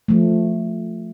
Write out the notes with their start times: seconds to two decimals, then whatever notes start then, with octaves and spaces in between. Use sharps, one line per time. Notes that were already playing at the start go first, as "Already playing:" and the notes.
0.08 F3 A3